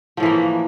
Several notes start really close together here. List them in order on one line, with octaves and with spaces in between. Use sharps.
F3 A2 E3 A#3